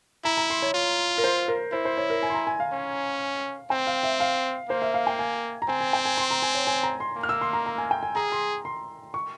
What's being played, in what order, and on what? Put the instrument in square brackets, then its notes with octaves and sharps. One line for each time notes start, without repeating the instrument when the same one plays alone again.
[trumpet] E4 [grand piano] A#5
[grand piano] A#5
C6
C#5
[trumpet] F4
[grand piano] A#4
C5
A#4
[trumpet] E4 [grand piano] C5
[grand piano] C5
C#5
A#4
G#5
C6
A#5
G#5
F5
[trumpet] C#4
[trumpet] C4 [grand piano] G5
[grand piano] F5
E5
F5
[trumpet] A#3 [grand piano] C5
[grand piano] E5
F5
G5
G#5
A#5
[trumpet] C4 [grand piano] G#5
[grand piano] G#5
G5
G#5
C6
A#5
G#5
C#5
G#5
A#5
C6
[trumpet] A#3
[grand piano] F6
E6
C6
A#5
A#5
G#5
G5
G#5
[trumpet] G#4 [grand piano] A#5
[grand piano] C6
C6
C#6